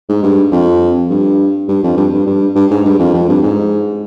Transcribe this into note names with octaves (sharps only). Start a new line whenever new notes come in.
G#2
G2
F2
G2
G2
F2
G2
G2
G2
G2
G#2
G2
F2
F2
G2
G#2